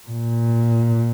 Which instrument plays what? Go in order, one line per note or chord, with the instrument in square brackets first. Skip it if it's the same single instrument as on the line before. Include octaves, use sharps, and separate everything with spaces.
[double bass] A#2